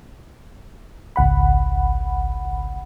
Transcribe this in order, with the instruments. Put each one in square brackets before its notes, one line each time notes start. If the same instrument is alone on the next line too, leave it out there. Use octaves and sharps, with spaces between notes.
[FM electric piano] G#1 C#2 F#5 B5